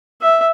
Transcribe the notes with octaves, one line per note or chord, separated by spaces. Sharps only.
E5